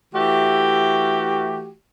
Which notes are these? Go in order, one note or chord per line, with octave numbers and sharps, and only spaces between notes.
E3 A3 F#4 G4